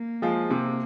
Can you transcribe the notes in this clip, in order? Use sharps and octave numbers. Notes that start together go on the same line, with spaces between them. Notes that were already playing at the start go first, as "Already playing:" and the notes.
Already playing: A#3
F3 G#3 F4
C3 A#3